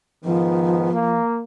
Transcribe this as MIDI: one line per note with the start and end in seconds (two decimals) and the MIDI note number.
0.24 0.89 44
0.24 0.89 51
0.24 1.19 53
0.24 0.89 59
0.92 1.41 58